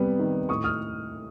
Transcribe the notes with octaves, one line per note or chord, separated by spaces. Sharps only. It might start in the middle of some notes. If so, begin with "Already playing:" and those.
Already playing: C3 G3 B3
D#3
A2 C#6 D#6
D#6 F6